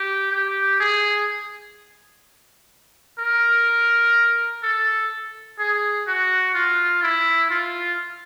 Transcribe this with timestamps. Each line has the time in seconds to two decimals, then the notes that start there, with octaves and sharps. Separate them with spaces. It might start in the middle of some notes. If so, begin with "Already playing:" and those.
Already playing: G4
0.32 G4
0.80 G#4
3.19 A#4
4.63 A4
5.59 G#4
6.07 F#4
6.54 F4
7.02 E4
7.50 F4